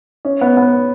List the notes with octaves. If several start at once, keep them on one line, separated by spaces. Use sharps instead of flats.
C#4
B3
B3